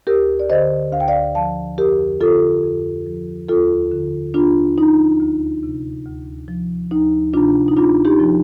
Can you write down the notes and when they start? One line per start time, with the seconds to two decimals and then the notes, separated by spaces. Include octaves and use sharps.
0.07 D2 G4 A#4
0.40 D5
0.50 D3 C5 D#5
0.92 D2 F5
1.00 G5
1.08 D5 F5
1.35 F3 F5 A5
1.78 F2 G4 A#4
2.21 D3 F4 A4
2.64 F2
3.06 F3
3.49 D#2 F4 A4
3.91 D3
4.34 D#2 D4 F4
4.78 F3 D#4
5.20 D2
5.63 C3
6.06 D2
6.48 F3
6.91 D2 D#4
7.33 C3 D4 F4
7.68 D#4
7.76 D2 D4 F4
8.05 D#4 G4
8.20 F3